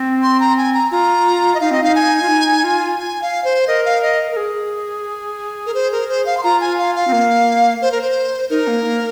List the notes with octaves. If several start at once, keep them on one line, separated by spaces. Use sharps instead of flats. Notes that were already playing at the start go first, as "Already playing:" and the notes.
Already playing: C4
C6
A#5
G#5
A#5
F4 A#5
D#5
D#4 F5
C4 D#5
D#4 F5
G#5
F4
D#4
F4
G#5
F5
C5
A#4 D#5
F5
D#5
A#4
G#4
A#4
C5
A#4
C5
F5
C6
F4 A#5
G#5
F5
F5
C4
A#3
C5
A#4
C5
D#4 A#4
A#3
A#3